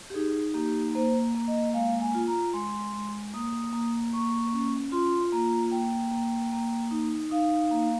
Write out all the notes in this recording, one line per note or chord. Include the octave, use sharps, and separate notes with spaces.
G4
D#4 G#4
A#3 G4
A#3 C5
A#3
D#5
G#3 F5
G#5
F4
A#5
G#3 C6
G#3
A#3 D#6
A#3
A#3 C#6
C#4
F4 C6
A#3 A#5
A#3 G5
A#3
A#3
D#4
D#4 F5
A#3